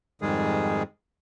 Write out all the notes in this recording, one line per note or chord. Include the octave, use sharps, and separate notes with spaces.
F2 G#2 D#3 G3 G#3 G#4